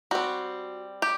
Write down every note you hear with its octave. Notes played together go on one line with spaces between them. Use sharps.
G3 C4 F#4
G4